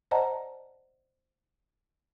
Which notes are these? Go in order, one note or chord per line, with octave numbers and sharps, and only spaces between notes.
C5 D5 D#5 F#5 A5 A#5